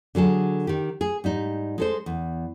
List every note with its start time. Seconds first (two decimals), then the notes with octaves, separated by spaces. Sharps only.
0.15 D3 F#3 G#4 A4
0.67 D#3 G4
1.01 G#4
1.24 G#2 G3 D#4
1.78 G#3 A4 C5
2.06 E2